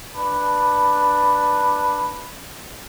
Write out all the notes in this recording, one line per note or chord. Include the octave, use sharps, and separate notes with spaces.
D4 B4